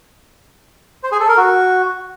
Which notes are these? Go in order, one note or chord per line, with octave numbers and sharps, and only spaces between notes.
C5
G#4
A4
A#4
F#4